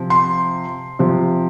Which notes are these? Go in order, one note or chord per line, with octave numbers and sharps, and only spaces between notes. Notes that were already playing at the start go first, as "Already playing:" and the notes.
Already playing: C3 F3
C6
C3 F3